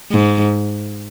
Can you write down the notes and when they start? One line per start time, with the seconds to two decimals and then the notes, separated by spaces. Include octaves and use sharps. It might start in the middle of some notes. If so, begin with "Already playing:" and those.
0.11 G#2